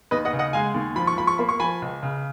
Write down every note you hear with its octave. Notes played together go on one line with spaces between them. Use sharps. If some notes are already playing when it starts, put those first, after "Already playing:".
D#2 B4 D#5
D#5 F#5
C#3
D#5 F#5
G#3 F5 G#5
D#2
F3 B5
C#6
F3 B5
C#6
A#3 B5
C#6
F3 G#5 B5
C#2
C#3